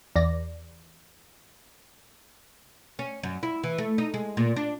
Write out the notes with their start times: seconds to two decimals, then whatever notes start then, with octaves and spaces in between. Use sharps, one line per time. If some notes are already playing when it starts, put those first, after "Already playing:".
0.16 E2 D5 A#6
2.99 C#4
3.23 F#2
3.43 E4
3.64 E3
3.78 A3
3.98 D#4
4.14 G#3
4.37 A#2
4.56 D4